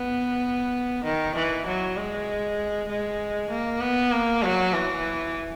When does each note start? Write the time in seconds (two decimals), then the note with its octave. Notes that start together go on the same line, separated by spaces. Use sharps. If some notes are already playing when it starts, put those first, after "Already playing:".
Already playing: B3
1.04 D#3
1.36 E3
1.66 F#3
1.97 G#3
2.89 G#3
3.50 A#3
3.81 B3
4.12 A#3
4.43 F#3
4.73 E3